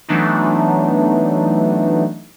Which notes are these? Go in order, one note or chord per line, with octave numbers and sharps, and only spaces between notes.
E3 F#3 A3 B3 D4 D#4